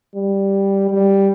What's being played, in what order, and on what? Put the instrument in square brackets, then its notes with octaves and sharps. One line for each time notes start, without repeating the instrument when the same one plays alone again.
[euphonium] G3
G3